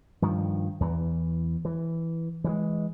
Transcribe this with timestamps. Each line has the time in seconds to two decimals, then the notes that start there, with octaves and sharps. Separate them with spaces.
0.22 G2 D#3 F3
0.80 E2 E3
1.65 E3
2.44 E3 F3 G#3